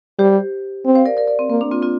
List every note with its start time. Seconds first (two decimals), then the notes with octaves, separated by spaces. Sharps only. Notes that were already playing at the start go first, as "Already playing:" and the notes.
0.18 G3 G4 C5
0.85 C4
0.95 C5 F5
1.06 A#4 D5
1.17 A#4 D5
1.27 A#4 D5
1.39 C4
1.50 A#3 C4
1.61 A#3 D4
1.71 C4 F4
1.82 C4 F4